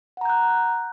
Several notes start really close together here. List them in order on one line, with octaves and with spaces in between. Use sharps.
F#5 A#5 G6 F#6